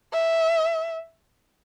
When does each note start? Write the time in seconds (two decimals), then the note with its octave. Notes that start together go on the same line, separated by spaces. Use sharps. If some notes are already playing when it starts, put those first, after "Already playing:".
0.13 E5